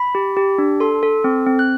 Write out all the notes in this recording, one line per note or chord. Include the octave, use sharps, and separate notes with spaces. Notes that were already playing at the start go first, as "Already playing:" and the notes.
Already playing: B5
G4
G4
D4
A4 C6
A4
C4
C4
F#6